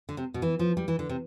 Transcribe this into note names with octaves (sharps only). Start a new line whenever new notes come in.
D3
C3
B2
E3
F3
G3
E3
D3
C3